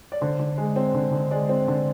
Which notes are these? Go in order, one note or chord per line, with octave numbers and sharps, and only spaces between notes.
D5
D3 C5
D3
G#3
C4
D3
D3
G#3 D5
C4
D3